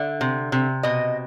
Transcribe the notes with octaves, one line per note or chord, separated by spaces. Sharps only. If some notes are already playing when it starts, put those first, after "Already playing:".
Already playing: D3 E5
C3
C3
B2 D#5